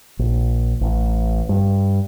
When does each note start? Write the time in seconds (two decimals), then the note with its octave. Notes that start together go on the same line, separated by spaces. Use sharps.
0.19 A#1
0.81 A1
1.49 G2